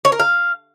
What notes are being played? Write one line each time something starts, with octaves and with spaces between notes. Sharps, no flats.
C#5
A#4
F5